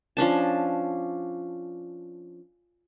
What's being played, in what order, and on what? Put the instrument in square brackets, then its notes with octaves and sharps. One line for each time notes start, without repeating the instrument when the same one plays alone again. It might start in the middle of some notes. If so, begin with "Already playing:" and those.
[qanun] F3 C#4 D4 A5